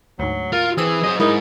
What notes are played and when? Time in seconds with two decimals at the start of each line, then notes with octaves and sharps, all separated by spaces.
0.19 D2 G#2 F#3
0.52 F4 A#4
0.77 E3 C4 G#4 E6 D#7
1.04 F#3 C5 D#5
1.20 G#2 D#4 E4 G#4 A#4